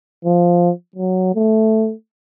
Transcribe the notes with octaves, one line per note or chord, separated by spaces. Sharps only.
F3
F#3
A3